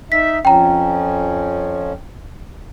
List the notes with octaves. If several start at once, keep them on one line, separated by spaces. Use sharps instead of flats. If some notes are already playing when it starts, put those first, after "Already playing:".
D#4 E5 B6
F2 F3 C#4 G5 A#5